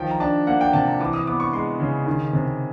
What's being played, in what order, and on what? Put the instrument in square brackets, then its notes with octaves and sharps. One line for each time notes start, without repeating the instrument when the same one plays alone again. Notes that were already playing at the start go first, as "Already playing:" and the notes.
Already playing: [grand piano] D#3 F3 G5
A#5
D4 A5
A#3 F#5
G5
C3 A5
A#5
E3 D6
D#6
B3 D6
C#6
G#3 C6
C#3
D#3
C3